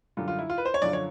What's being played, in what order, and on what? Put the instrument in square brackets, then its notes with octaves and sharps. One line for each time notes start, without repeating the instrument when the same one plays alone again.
[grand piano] F#2 D3 G3 F4
F4
E4
F4
B4
C5
C#5
F#2 D3 F3 D5
C#5